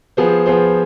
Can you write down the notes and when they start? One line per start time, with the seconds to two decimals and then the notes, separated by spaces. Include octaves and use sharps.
0.17 F3 B3 F4 G#4 C5
0.46 F3 B3 F4 G#4 C5